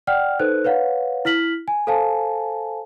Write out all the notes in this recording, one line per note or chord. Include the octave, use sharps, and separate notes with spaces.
D5 F#5 G5 F6
D#4 A4 B4 C5 F#6
B4 C#5 F5 F#5
E4 F6 B6 F#7
G#5
A4 C5 F5 G#5 A5